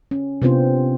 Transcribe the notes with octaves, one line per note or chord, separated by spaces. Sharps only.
C#4
C3 B3 C4 D4 F4 C5